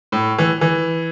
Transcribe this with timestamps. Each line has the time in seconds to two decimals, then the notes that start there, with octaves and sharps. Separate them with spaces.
0.12 A2
0.38 E3
0.61 E3